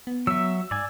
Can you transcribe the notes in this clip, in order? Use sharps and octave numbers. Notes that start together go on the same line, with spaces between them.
B3
F#3 E5 E6
G#2 D5 G#5